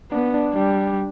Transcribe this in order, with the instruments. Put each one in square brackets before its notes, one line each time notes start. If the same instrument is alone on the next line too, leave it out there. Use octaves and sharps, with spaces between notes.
[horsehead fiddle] B3 [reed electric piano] D4
[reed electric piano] D4
[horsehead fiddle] G3 [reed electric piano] D4